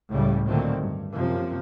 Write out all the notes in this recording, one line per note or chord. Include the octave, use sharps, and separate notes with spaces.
C#2 A2 C#3 G3
A#2 D3 D#3 F#3 A3 C4
G2
F#2 C3 F3 A#3